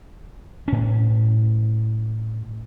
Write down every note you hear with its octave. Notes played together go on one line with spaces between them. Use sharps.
A2 C#4